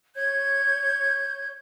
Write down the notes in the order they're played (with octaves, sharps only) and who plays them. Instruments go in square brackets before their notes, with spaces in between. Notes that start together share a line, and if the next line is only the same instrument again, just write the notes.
[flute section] C#5 G6 G#6